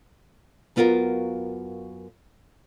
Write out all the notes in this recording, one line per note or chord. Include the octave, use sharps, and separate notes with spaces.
F#2 B3 F4 F#4 A#4 F5